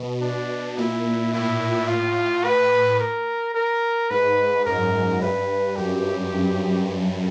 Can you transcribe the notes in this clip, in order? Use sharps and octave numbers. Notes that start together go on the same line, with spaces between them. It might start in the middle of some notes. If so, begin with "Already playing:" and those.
Already playing: B2
B2 D4
A#2 E4
A2 E4
A2 F4
A2 B4
A#4
A#4
G#2 B4
F#2 A#4
G2 B4
F#2 G4